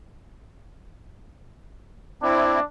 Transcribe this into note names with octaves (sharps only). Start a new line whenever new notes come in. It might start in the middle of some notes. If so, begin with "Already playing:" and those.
C4 D4 E4